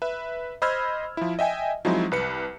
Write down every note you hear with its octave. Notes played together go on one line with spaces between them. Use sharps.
B4 E5
C5 D#5 B5 E6 F6 G#6
F3 E4
D#5 E5 G5 G#5
F3 F#3 G#3 C4 D#4 E4
C2 B4 C#7